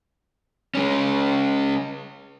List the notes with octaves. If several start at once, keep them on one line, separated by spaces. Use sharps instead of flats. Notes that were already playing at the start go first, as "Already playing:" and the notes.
G#3 C#4